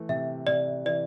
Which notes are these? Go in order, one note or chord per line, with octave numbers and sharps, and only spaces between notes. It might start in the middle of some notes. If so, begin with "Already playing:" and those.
Already playing: E3 A3
C3 E5
C3 D5
E3 D5